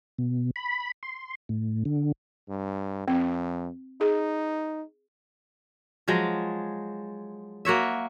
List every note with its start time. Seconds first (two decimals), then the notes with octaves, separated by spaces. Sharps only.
0.18 B2
0.56 B5
1.03 C6
1.49 A2
1.85 D3
2.49 G2
3.08 F2 C4
4.01 D#4 G#4
6.08 F3 F#3 G#3
7.65 A#3 F#4 C#5 E5